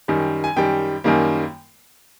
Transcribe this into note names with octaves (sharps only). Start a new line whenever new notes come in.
F#2 D#3 G3
G#5
F#2 D#3 G3 G5
F#2 D#3 G3 A#3